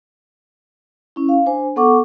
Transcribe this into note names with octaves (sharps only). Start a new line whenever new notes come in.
C#4 E4
F5
D4 C5 G#5
B3 A4 F#5 C#6 D6